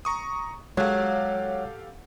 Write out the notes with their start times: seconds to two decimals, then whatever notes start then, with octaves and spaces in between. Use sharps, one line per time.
0.05 A#5 C#6 D#6
0.77 F#3 G#3 G4 A4 C#5 F5